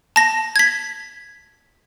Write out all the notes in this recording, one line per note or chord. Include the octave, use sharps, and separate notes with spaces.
A5 A#6
G#6 B6